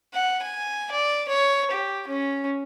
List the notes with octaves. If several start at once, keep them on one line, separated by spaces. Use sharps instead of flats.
F#5
G#5
D5
C#5
G4
C#4